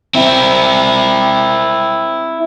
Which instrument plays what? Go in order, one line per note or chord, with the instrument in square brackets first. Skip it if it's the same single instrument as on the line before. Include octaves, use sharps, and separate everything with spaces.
[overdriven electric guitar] C4 E4